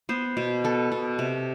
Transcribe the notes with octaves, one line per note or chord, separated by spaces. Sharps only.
B3 C5
B2
B3 A4
B2
C3